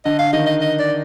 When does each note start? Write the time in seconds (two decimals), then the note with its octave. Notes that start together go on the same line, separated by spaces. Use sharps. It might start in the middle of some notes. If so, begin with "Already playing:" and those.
0.05 D3 D#5
0.19 F5
0.33 D#3 D#5
0.46 D#5
0.61 D#5
0.79 D5